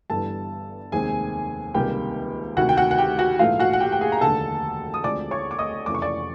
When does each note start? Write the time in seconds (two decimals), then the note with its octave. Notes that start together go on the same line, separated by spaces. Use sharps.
0.10 G1 G2 E3 G3 A4 A5
0.92 F1 D#2 D#3 G#3 C4 G#4 G#5
1.74 C#2 C3 D#3 G3 A#3 G4 G5
2.57 D2 C3 D#3 F#4 F#5
2.69 G5
2.77 F#4 F#5
2.91 F#5
2.98 G4 G5
3.19 F#4 F#5
3.39 A#1 G#2 E3 A3 F4 F5
3.60 F#4 F#5
3.73 F#5
3.80 G4 G5
3.92 G5
4.01 G#4 G#5
4.12 A#5
4.21 F1 D#2 D3 A4 A5
4.94 D#6
5.04 D2 D3 F3 G#3 C4 D5 D6
5.31 C#5 C#6
5.51 D6
5.59 D#5 D#6
5.86 F1 F2 C#3 E3 A3 D6
5.95 C#6
6.02 D5 D6